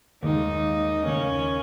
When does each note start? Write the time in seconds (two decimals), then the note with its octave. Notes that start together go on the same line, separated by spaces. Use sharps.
0.23 D#2 D#3 G#3 D#4
1.06 D#2 C#3 A#3 C#4